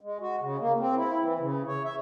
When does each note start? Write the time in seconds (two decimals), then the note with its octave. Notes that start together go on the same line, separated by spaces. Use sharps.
0.01 G#3
0.21 F#4
0.41 C#3
0.60 A#3
0.80 C4
0.95 E4
1.21 E3
1.40 C#3
1.67 C#5
1.85 E5